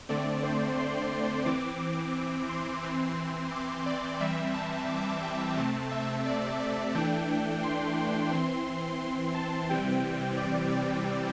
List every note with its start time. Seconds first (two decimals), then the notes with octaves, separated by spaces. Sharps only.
0.09 D3 A3 C4 D5
0.43 C5
0.77 C6
1.46 E3 C4 D6
2.49 C6
2.83 E3 C4
3.52 D6
3.86 D5
4.20 E3 G3 C4 E5
4.54 A5
4.89 D6
5.23 G5
5.57 C3 A3 C4 A5
5.92 E5
6.26 D5
6.60 D5
6.95 E3 A3 D4 G5
7.63 C6
8.32 E3 C4 C6
9.35 A5
9.69 C3 E3 G3 C4 G5
10.37 D5
10.72 D5